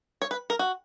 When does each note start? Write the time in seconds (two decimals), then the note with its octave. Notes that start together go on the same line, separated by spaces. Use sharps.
0.22 C#5
0.31 B4
0.50 A#4
0.59 F#4